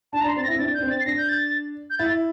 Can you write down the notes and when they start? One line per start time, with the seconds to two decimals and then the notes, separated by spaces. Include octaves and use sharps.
0.13 D4 A5
0.21 A#5
0.24 D4
0.28 C6
0.36 C4 A6
0.44 A#6
0.48 E4
0.54 C4
0.59 D4 A6
0.74 G6
0.78 D4
0.82 C4
0.90 A6
1.01 C7
1.06 D4 A#6
1.18 G6
1.29 A6
1.90 G6
1.98 E4 A6